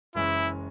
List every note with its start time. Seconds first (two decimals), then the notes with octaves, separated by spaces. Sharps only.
0.15 F#1 F#2 E3 G#3 C#4 E4